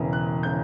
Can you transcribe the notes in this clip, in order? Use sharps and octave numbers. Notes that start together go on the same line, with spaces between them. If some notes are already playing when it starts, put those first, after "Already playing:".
Already playing: E1 E2 C#3 E3
F#6
C#3 E3 G6